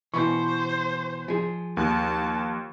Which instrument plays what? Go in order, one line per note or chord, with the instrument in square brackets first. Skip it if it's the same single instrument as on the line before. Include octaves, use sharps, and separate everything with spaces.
[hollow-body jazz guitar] B2 E3 [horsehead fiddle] C5 [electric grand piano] C#6
[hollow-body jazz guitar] F3 G#4
[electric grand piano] D#2 [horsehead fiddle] A5